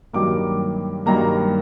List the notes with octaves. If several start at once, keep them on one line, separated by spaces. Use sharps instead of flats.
G2 D#3 F#3 A#3 D6
G2 D#3 F#3 A#3 A#5